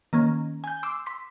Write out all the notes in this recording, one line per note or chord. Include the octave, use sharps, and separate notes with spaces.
D#3 A#3 C#4
G#5 G6
C6 D6 E6
C6 B6